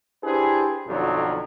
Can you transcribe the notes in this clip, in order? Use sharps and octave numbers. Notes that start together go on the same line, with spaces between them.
D4 E4 G4 G#4 B4 C5
B1 F2 D3 F#3